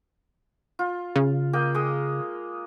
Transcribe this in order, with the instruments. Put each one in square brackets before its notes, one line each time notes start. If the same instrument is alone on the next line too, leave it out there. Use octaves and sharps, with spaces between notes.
[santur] F4
[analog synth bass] C#3
[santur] A#3 D#5 G5
G#3 D#6